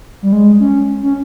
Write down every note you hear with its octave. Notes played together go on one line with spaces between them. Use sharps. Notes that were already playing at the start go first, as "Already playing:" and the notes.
G3
G#3
C#4
C#4